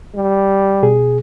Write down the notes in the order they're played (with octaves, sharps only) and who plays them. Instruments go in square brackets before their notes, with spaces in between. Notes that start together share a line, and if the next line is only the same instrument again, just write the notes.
[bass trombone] G3
[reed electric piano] B2 G#4